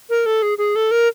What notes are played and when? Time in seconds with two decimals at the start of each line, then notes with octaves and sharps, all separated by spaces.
0.10 A#4
0.26 A4
0.42 G#4
0.58 G#4
0.76 A4
0.91 A#4